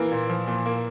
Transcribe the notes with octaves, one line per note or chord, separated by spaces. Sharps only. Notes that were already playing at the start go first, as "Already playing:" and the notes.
Already playing: E3 A#3
A#2
F3
A#2
A#3